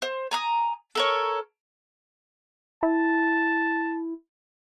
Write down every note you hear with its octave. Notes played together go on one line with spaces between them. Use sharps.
C5
G#5 A#5 D#6
A4 A#4 C#5
E4 A5